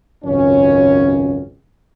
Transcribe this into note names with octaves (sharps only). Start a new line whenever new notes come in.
G#1 C#2 F#2 C#4